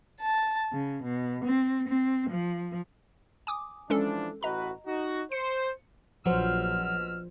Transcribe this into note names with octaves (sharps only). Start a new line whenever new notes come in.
A5
C#3
B2
C4
C4
F3
G#5 D6 D#6
E3 F3 G#3 C#4 D4 A4
A1 F#4 B4 D#5 A#5
D#4 F#4
C5 C#7
A#1 B2 F3 F#3 C5 E6 F6